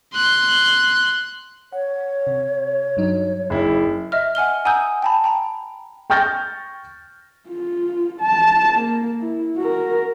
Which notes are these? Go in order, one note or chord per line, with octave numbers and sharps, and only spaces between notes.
C6 F#6
C#5 F#5
C3
G2 F#3 D#4
F#1 E4
D#5 E5 F6
F#5 G#5 F6 G7
F#5 G#5 A#5 D#6 E6 G6
G5 A5 B5
G5 A#5 B5
G5 C#6 F6 G6 A6 A#6
F4
A5
A#3
E4
F#4 A#4